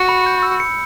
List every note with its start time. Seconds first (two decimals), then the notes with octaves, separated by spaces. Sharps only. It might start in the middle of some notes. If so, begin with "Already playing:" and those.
Already playing: F#4 C#7
0.09 B5
0.26 G6
0.43 E6
0.60 C#7